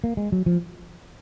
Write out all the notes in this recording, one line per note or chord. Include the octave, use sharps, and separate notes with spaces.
A#3
G#3
F#3
F3